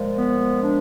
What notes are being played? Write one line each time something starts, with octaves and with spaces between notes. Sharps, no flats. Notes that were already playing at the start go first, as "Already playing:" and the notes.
Already playing: A#2 F3 G#3
B3
D4